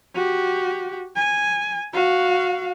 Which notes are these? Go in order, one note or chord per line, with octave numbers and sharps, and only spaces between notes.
F#4 G4
G#5
F#4 F5